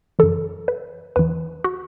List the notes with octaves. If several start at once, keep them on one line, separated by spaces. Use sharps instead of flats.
F#2 C#3 E3 A4
B4
E2 E3 B4
F#4